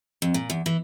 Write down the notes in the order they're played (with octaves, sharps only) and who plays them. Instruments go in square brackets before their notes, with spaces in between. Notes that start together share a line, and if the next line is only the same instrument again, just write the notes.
[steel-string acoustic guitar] F2
A#2
E2
E3